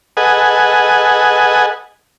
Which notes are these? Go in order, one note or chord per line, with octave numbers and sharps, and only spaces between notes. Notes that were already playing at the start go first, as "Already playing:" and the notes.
G#4 A4 B4 D#5 F#5 G#5